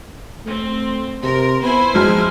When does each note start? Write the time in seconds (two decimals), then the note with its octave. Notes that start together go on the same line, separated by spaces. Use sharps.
0.46 A3 C4
1.23 C3 A#4 C6
1.62 B3 E4 C5 G#5 B5
1.94 F2 G#2 F#3 G#3 F6